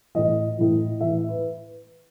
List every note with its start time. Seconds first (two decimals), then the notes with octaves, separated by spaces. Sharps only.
0.15 A2 E3 D#5
0.58 A2 E3
1.01 A2 E3 E5
1.29 B4